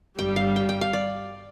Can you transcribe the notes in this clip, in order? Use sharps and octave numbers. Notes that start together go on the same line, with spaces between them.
G1 G2 G3 G5
F5
G5
G5
F5
D5